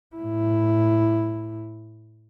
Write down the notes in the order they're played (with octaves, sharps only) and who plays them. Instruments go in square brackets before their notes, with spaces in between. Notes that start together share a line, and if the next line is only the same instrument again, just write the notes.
[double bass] A2 E4